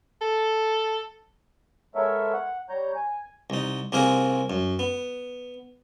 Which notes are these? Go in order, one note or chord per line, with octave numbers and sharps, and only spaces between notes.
A4
G#3 B3 A4 A#4 C#5 E5
F#5
G3 C#5 A#5 G6
G#5
C2 D#4
C2 A#3 C4 G#4 A#4 G#5
F#2
B3